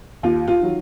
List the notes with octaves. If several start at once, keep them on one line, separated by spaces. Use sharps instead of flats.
D#2 F4
F4
D#3 F#3